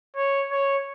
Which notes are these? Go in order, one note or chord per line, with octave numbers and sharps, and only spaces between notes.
C#5
C#5